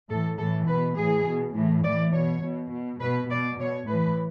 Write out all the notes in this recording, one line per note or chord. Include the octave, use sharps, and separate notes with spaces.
A2 E3 A4
A2 E3 A4
B2 B4
A2 E3 G#4
B2
A2 E3
A2 E3 D5
B2 C#5
B2
B2
B2 B4
B2 D5
B2 C#5
A2 E3 B4